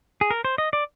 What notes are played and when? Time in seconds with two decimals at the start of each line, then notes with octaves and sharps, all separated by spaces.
0.21 G#4
0.31 A#4
0.45 C5
0.58 D#5
0.73 D5